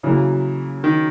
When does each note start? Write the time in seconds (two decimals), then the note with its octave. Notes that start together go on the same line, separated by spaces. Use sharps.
0.03 C#3 E3 F#3 A#3
0.84 D#3